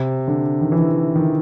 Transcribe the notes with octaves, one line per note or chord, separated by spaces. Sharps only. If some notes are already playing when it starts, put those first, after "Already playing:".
Already playing: C3
D3
D#3
E3
D#3